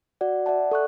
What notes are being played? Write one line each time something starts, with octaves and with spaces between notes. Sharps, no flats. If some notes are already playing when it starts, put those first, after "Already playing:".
F#4 D5 F#5
D5 E5 F#5 A5
A4 C#6 F#6